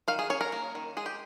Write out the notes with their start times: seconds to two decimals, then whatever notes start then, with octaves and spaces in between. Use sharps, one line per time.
0.08 D#3 F5
0.19 G#4
0.30 C#4 C#5
0.41 A#4
0.52 A#3
0.75 D#3
0.97 G#3 G#4
1.06 G4